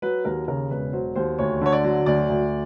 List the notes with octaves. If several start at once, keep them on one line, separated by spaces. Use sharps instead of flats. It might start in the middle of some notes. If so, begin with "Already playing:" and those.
F#3 B4
D#2 A#4
C#3 A#4
E1 B4
F#3 C5
D#2 C5
D2 C#5
D3 C#5
D5
F#3
D2 D5
D2